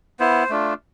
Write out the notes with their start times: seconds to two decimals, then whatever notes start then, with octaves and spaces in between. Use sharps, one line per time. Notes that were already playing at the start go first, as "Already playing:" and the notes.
0.20 B3 E4 C5
0.50 A3 D4 F4